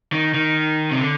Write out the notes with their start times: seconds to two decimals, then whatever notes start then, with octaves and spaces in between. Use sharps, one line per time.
0.12 D#3
0.34 D#3
0.91 C3
1.00 D3